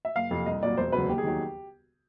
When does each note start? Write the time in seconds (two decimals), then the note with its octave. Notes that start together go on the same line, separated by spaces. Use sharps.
0.05 E5
0.16 F#1 F5
0.31 F2 C3
0.46 C2 D#5
0.63 A#2 F#3 D5
0.77 E1 C5
0.92 D2 C#3 F#3 B4
1.09 D#2 G4
1.18 G#4
1.24 D#3 F#3 G4